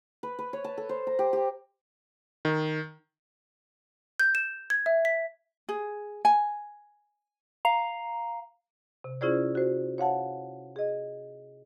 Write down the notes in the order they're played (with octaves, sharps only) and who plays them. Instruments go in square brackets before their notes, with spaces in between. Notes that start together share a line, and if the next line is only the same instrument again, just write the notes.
[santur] B4
B4
C#5
A5
A4
C5
A#5
G4
G4
[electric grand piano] D#3
[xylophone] G6
E7
G#6
E5
B6
[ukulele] G#4
G#5
[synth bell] F5 A#5
[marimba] C3
C#4 E4 F4 G#4 C5 D5
F#4 C5
C#5 F5 F#5 A5
G#4 D#5